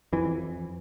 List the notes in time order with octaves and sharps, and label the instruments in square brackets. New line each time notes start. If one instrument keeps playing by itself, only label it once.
[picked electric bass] F2 E3